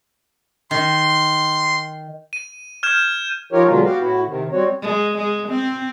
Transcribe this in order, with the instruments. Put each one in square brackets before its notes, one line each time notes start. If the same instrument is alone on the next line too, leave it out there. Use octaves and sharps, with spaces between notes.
[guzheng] D#3 [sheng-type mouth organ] C6
[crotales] D#7
F6 G6 G#6 E7
[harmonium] F3 D#4 F4 G4 A#4 C#5
B2 D3 F#3 G#3 A#3 F4
B3 F#4 G4 F5
A2 E4 F#4
C3 D#3
G3 C4 F#4 C#5
[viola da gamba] G#3
G#3
C4